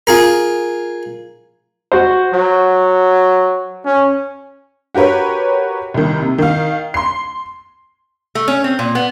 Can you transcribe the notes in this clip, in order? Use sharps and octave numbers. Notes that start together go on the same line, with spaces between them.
F4 G#4 A#4
F#4 C5
F#3
C#4
F#4 G4 A#4 B4 C#5
C2 D#3
C3
D#3 F5
C6 C7
A3
C#4
C4
A#2
B3